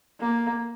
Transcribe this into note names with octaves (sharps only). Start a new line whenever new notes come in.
A#3